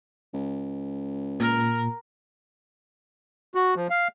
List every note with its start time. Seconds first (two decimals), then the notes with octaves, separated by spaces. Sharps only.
0.34 C#2
1.40 A#2 A#4
3.55 F#4
3.76 F3
3.90 F5